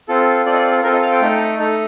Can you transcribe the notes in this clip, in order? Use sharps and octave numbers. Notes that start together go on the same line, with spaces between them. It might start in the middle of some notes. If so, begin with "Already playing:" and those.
C4 F4 A4
C4 F4 A4 D5
D#5
D5
A4
C4 F4 A4 A#4
D#5
F5
G5
A3 D#4 A4
A3 D#4 A4